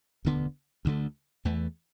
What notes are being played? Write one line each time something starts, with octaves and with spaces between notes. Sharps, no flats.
E1 D2 D3 B3
D2 D3 A3
E2 E3 A3